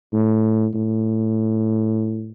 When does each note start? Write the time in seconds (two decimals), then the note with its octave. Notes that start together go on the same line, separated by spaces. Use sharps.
0.13 A2
0.75 A2